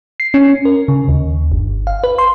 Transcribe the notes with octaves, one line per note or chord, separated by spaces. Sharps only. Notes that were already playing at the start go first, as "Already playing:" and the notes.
C7
C#4
A#4
C#3
D#2
G1
F5
B4
C6